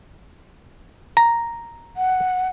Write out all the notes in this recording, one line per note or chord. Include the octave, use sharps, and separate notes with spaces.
A#5
F#5